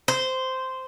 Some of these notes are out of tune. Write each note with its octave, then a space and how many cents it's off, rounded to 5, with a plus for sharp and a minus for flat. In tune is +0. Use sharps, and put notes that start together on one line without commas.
C5 -10